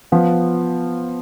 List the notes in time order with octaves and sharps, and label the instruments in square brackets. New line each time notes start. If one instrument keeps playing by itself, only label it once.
[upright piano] F3 [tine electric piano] B3